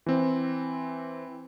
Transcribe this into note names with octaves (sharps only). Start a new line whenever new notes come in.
E3 C4